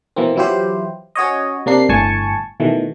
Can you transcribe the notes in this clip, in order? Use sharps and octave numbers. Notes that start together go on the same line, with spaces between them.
B2 E3 A#3 C4
E3 F#3 E4 F4 G4 C5
C#4 F#4 C#5 D#5
C3 A#3 D4 C7
G1 A2 G#5 A5 C#6
B2 D#3 E3 A3